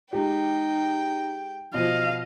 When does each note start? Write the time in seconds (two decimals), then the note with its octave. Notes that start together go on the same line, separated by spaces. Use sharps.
0.13 G#3 D#4 G4 G5
1.74 B2 F3 D#5 F5